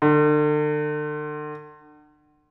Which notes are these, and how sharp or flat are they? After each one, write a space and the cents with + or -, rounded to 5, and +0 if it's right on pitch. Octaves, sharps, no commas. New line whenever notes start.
D3 +40